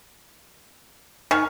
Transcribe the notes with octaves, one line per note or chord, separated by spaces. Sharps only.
D#3 G#5 C#6 F6